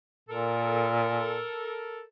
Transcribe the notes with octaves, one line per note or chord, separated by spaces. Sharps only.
A#2 A4 A#4